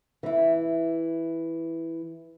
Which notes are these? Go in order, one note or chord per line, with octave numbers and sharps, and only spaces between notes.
E3 E4